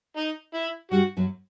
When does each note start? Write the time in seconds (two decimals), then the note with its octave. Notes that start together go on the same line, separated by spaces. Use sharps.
0.17 D#4
0.54 E4
0.91 G2 G3 F#4
1.17 F#2 F#3